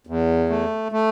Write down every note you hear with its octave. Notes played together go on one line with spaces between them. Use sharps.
E2
A3
A3